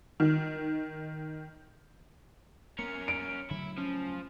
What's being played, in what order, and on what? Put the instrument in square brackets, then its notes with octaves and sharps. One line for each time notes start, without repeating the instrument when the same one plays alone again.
[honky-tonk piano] D#3
[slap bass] A#3 B3 [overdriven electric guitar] C#4 A#4 [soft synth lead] C#7
[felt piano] D7
[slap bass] C#3 F#3 A3 [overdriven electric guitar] E4
[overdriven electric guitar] F3 [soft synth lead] C#4